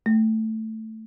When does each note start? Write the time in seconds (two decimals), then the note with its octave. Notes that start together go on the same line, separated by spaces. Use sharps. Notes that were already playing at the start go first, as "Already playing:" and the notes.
0.06 A3